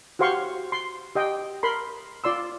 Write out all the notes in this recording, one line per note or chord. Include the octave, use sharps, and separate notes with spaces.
F#4 G4 C5 F5 C6 C#6
C6
G4 D#5 G5
A#4 B5 C6
F4 D5 C6 E6